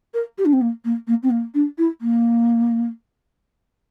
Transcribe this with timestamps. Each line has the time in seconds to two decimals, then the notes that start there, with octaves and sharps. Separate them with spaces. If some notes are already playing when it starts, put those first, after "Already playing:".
0.14 A#4
0.38 G4
0.45 D4
0.52 C4
0.61 A#3
0.84 A#3
1.07 A#3
1.22 C4
1.30 A#3
1.54 D4
1.78 E4
2.01 A#3